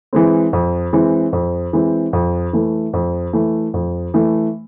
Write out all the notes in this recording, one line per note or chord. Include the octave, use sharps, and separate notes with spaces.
E3 G#3 C4
F2
E3 G#3 C4
F2
E3 G#3 C4
F2
E3 A3
F2
E3 A3
F2
E3 A3